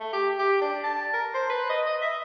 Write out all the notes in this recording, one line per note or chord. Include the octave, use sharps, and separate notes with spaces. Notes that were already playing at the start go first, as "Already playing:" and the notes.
A3
G4
G4
D4
A5
A#4
C5
B4
D#5
D#5
E5